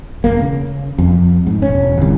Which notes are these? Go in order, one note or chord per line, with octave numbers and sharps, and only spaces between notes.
E1 F2 A#3
C#3
F2
G#2
E1 C#4
G1 C2